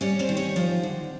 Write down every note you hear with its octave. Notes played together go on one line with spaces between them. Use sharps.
G3 C#4 C#5
C4 C5
D#3
C#4 C#5
F3 C4 C5
D3